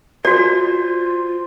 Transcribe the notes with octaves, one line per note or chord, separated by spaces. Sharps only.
F4 F#4 C5 D5